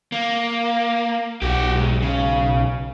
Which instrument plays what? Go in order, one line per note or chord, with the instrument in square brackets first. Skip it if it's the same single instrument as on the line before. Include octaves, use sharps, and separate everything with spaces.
[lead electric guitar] A#3
[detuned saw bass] B1 [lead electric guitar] F#4 G4
[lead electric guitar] G#2
C#3